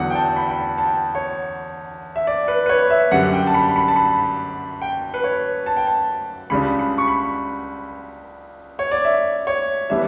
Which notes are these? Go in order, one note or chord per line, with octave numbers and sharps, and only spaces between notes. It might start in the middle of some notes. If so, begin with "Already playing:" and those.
Already playing: E2 D3 F#3 F#5
G5
A5
B5
G5
A5
A5
G5
C#5
E5
D5
B4
B4
C#5
E5
F#2 D3 G3 F#5
G5
A5
B5
B5
A5
B5
G5
B4
C#5
A5
G5
A5
C#2 C#3 G3 D4 B5
B5
C#6
B5
C#5
D5
E5
C#5
E3 G3 B3 D4 E5